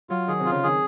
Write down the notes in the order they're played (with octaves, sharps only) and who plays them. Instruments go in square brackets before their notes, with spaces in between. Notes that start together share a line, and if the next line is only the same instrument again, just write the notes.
[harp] F#3 [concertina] F4
[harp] D#3 [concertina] G#4
[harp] C3
[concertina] F4
[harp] C#3
[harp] D#3 [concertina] G#4